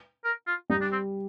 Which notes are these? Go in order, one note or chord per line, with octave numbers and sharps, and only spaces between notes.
A#4
F4
G3 D#4
D4
C4